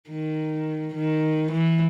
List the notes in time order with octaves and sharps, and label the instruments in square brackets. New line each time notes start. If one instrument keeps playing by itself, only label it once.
[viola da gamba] D#3
D#3
E3